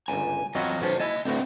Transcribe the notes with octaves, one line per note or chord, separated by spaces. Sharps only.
G1 C#2 G#5 A#5
E2 F#3 C4 F4 F#4 D#5
B1 C#4 F#4 C5 A5
A#3 E4 D#5 G#5 A5
D2 A2 C4 F#4 B4